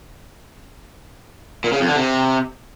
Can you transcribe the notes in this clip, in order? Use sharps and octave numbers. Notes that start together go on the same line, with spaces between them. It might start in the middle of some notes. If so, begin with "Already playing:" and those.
A#2
C#3
F2
D3
C3